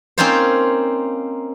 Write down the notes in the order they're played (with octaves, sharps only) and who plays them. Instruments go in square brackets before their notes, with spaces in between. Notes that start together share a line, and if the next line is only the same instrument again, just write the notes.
[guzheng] A#3 C4 C#4 D#4 F4 C5